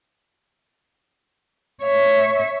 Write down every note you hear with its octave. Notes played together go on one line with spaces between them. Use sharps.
C#5 E5